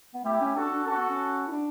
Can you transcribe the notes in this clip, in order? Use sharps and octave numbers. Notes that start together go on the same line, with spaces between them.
B3
A3 E4 G4
C#4
D4 F#4 A4
D4
C#4 F#4 A4
B3
C#4
E4
D4